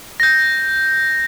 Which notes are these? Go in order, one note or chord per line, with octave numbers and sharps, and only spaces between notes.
G6 A#6